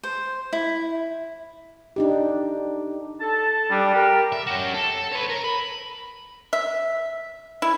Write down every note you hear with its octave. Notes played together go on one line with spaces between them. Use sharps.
C5
E4
D4 D#4 G4
A4 A5
G3 D4
G4 A#4
E5
C#4 F#4
A4
B4 C#5
A#4
B5
E5
E4